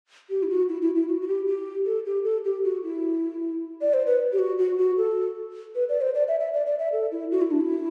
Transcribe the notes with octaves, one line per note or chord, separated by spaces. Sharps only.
G4
E4
F#4
E4
E4
E4
F#4
F#4
G4
G4
A4
G4
A4
G4
F#4
E4
D5
C5
B4
G4
F#4
F#4
F#4
A4
B4
D5
C5
D5
E5
E5
D5
D5
E5
A4
E4
F#4
E4
D4
E4